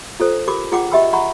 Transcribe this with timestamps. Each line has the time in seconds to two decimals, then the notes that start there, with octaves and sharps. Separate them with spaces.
0.20 F4 A4 C5
0.48 G4 A#4 B5 D6
0.72 F4 G#4 F#5 G5 D6
0.92 G4 D#5 E5 G5 B5 E6
1.13 F#5 A#5 B5 C#6